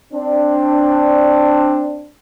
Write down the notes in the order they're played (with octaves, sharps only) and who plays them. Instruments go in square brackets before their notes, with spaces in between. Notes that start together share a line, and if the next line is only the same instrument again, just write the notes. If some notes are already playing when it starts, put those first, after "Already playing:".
[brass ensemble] C4 D4